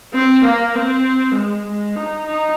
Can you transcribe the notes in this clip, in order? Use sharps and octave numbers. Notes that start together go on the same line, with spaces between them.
C4
A#3
C4
G#3
G#3
D#4
D#4